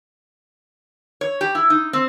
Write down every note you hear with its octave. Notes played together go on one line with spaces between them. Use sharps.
C#5
G4
E4
D#4
C4